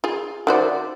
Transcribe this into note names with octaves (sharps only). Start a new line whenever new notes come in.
F4 G#4
D#3 F#4 C5 D5 E5 F#5